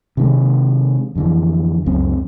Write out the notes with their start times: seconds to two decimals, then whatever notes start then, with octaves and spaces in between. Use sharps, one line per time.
0.17 C3 D#3 G#3
1.15 F2 D3 E3
1.86 C#2 F#2 C4